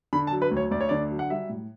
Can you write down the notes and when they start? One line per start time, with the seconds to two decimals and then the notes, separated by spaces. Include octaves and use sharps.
0.13 D3 B5
0.27 A5
0.32 F#3
0.42 B4
0.51 D2
0.57 C#5
0.71 D2 D5
0.81 C#5
0.89 D3 D5
1.11 F#3
1.19 F#5
1.30 G3 E5
1.49 A2